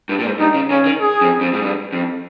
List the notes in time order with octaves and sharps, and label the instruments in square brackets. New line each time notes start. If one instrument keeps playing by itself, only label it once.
[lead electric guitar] G2
A#2
G#2
[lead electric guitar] G2 [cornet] D#4
[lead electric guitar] C#3
[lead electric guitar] C#3 [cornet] C#4
[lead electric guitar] D#3
[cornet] G#4
[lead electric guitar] F2
F2
G#2
G2
F2